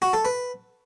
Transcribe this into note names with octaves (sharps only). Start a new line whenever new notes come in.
F#4
A4
B4